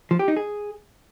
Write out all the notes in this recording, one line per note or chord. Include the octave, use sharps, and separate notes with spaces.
F3
G4
D#4
G#4